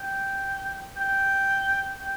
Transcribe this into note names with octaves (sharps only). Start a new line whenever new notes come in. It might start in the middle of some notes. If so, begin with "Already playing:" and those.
Already playing: G5
G5
G5